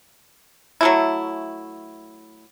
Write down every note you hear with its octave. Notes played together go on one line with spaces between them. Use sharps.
F#3 A3 E4